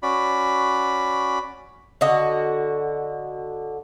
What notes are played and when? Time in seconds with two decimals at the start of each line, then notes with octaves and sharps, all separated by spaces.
0.03 C#4 F#4 D5 B5
2.01 D3 F#4 D#5